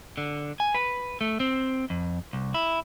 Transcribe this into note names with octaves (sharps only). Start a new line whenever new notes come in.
D3
G#5
B4
A3
C4
F2
C2
E4